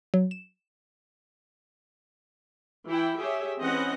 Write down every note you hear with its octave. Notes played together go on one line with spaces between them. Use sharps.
F#3
E7
E3 E4 G5
G4 G#4 C#5 E5
E3 C4 C#4 B4 D#5 F#5